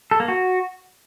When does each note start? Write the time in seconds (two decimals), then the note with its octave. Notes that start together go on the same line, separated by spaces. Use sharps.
0.11 A4
0.20 A#3
0.28 F#4